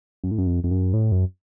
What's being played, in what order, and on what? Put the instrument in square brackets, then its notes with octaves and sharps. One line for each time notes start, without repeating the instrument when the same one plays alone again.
[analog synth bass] F#2
A2
F#2
F2
F2
F#2
A2
F#2